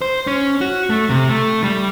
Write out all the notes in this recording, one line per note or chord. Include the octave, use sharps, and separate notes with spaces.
C5
C#4
F#4
A3
C3
A3
G3